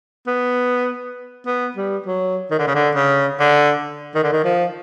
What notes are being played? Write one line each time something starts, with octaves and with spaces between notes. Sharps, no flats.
B3
B3
G3
F#3
D#3
D3
C#3
D3
C#3
D3
D#3
D3
D#3
F3